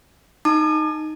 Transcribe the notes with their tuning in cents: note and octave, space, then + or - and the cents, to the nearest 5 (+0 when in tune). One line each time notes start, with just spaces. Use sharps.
D#4 +0 A5 +35 D6 +45